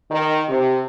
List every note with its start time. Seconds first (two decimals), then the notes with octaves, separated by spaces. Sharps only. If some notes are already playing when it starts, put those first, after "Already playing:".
0.11 D#3
0.49 C3